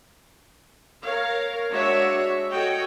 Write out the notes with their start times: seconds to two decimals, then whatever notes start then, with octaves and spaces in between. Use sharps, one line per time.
1.01 A#4 C#5 F5
1.70 G#3 D4 F#4 C#5 E5
2.51 F#4 A4 C#5 D#5 G5